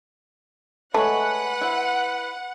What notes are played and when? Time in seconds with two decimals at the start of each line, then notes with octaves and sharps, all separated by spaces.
0.94 G#3 A3 B4 C#5 F#5
1.61 E4 C5